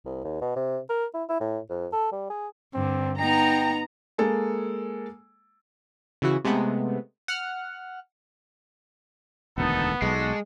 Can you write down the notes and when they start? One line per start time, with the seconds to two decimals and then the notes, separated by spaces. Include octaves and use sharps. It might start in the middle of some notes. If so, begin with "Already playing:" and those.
0.05 C2
0.25 D#2
0.42 B2
0.56 C3
0.89 A#4
1.14 E4
1.29 E4
1.41 A2
1.70 F2
1.93 A4
2.12 G3
2.30 G#4
2.74 G2 D3 C4
3.19 B3 D#4 G5 A#5
4.18 G#3 A#3 A4 G#5
6.22 C#3 E3 F#4
6.44 C3 G#3 A3 B3
7.28 F#5 F6
9.58 E1 D2 D#3 B3 D#4 A4
10.02 B1 G#3 D4 F#4 A4